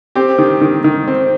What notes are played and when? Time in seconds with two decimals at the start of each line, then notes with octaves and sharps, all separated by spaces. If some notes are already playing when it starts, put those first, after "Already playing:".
0.15 C4 G4
0.38 D#3
0.61 D#3
0.84 D#3
1.08 C4